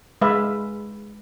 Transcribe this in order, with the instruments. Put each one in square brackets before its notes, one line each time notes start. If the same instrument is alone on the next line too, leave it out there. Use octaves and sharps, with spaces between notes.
[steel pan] G#3 B4 E5 F5